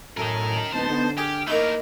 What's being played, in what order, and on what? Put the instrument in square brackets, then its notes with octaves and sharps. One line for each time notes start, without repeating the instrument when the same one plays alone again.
[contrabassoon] F#2 [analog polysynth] A2 A4 G#5 [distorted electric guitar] A#4 D#5
[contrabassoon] D1 [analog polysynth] B3 D#4 A5 [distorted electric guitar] C5
[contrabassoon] D3
[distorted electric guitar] G4 [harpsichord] G#4 [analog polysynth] F6
[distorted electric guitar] A3 A#4 [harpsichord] A#3 D#4 E4